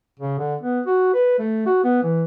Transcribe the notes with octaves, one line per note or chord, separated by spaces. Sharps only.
C#3
D3
B3
F#4
B4
A3
F#4
B3
E3